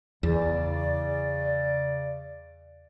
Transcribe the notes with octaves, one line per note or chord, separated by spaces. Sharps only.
E2 C#3 D5